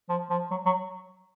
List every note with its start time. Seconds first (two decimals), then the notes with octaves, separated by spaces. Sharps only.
0.09 F3
0.30 F3
0.51 F#3
0.66 F#3